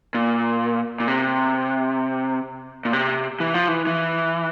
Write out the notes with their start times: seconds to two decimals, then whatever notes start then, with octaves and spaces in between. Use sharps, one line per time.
0.15 A#2
1.00 A#2
1.08 C3
2.85 A#2
2.93 C3
3.40 E3
3.54 F3
3.68 E3
3.87 E3